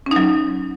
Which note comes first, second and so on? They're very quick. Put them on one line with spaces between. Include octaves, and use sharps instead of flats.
C#4 D#4 F#3